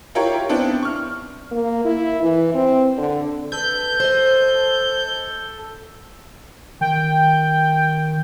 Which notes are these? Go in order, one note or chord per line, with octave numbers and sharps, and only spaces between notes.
E4 F4 G4 A#4 C#5
B3 C4 D4 E4
C#6 F6
A#3
E4
E3
C4
D3
A4 B4 G6
C5 D#5
D#3 G5